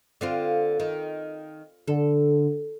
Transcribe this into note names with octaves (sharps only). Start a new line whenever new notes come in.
D3 C4 F4
D#3
D3 A4